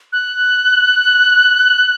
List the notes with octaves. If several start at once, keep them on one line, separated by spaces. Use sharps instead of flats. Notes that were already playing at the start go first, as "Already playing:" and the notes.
F#6